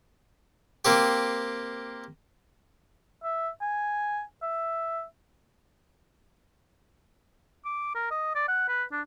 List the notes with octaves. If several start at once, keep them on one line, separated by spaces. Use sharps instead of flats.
A#3 C4 G4
E5
G#5
E5
D6
A#4
D#5
D5
F#5
B4
D4